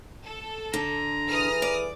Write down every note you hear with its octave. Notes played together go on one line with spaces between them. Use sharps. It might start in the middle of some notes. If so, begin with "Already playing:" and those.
A4
D3 A#5
E3 G#4 B4 D#6 F6
D5